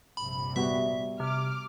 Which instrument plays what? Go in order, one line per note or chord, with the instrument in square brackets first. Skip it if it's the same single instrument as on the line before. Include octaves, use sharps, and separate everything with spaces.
[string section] A#1 G2 C3 [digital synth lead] B5
[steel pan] G3 B3 F#4 [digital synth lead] E5
[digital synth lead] C3 [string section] D6 F6